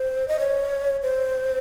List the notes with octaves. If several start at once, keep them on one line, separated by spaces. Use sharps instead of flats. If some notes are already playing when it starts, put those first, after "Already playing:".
Already playing: C5
D#5
C#5
C5